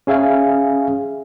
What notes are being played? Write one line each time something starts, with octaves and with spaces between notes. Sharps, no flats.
C#4 G#4 E5 F5 G#5